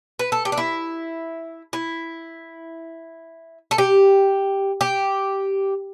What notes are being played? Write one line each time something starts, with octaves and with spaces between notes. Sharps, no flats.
B4
A4
G4
D4
E4
E4
A4
G4
G4